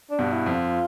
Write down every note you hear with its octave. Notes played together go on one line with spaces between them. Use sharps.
D4
G2 B2
E4
F2
F4